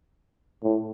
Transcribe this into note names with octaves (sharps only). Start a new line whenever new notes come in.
A2